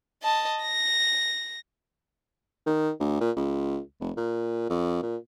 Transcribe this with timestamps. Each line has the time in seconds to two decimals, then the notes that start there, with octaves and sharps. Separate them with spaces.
0.23 D#5 A5
0.62 A#6
2.66 D#3
3.00 D2
3.20 A#2
3.36 C#2
4.00 F1
4.17 A#2
4.70 F2
5.02 A#2